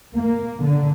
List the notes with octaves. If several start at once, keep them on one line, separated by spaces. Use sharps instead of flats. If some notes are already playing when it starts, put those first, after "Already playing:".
A#3
D3